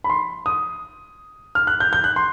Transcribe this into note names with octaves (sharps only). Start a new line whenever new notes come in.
B5
C6
D#6
F6
F#6
G6
G6
F#6
C6